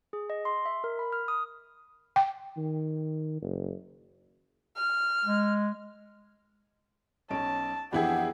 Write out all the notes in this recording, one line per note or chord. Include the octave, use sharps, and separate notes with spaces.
G#4
D#5
C6
E5
A#4
B5
F6
D#6
G5
D#3
F#1
F6
G#3
B1 C#4 A5 D7
F2 E3 B3 D4 E4 G4 G#4 F#5